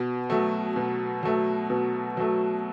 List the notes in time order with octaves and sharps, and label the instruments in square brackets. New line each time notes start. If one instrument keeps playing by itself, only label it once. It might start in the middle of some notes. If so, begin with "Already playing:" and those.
Already playing: [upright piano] B2
F#3 A3
B2
F#3 A3
B2
F#3 A3